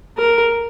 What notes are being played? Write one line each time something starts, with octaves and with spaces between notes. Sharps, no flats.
A#4